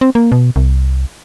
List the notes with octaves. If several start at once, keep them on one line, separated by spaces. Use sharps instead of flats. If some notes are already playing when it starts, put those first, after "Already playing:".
C4
A#3
B2
C2